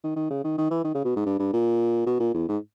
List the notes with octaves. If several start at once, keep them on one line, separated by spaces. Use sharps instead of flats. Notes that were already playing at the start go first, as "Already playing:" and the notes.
D#3
D#3
C#3
D#3
D#3
E3
D#3
C#3
B2
G#2
G2
G2
A#2
B2
A#2
E2
G#2